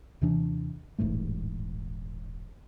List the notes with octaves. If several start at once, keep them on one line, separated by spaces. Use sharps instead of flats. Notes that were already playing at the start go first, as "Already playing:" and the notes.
D#2 C3 E3 D4
D#1 A1 G#2 A3